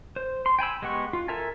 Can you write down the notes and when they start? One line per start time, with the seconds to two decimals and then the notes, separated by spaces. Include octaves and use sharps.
0.16 C5
0.46 C6
0.59 G5 G#5 B5 E6
0.82 G#3 B3 G4 F#5 C#6
1.13 F4
1.28 A4 A#4 E5 G#5 A5